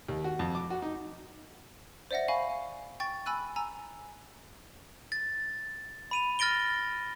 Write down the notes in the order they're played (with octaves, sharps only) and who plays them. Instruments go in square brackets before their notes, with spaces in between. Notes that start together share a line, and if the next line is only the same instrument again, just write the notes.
[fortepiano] D#2
F#4
F2
D6
F#4
D#4
[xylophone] C5 D5 E5 F#5 A#6
F5 G#5 B5 C#6
G5 C#6 A6
G#5 B5 E6 F#6 D#7
G#5 A#5 E6
[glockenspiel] A6
B5 D#7 F7
F6 A6 A#6 D7 G7